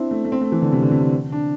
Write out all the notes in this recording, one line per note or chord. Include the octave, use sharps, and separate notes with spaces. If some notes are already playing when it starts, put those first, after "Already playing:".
Already playing: C4 D4 E4
A3
A3
C4
A3
E3
D3
C3
D3
C3
D3
D4